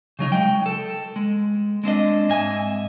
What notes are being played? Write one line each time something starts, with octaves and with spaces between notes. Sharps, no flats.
C#3 F#3 D#4
G#3 G5
A4
G#3
G#3 C4 D4 D#5
G#2 D#5 E5 G#5